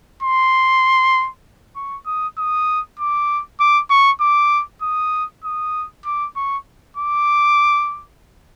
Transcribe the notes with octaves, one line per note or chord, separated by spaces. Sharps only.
C6
C#6
D#6
D#6
D6
D6
C#6
D6
D#6
D#6
D6
C#6
D6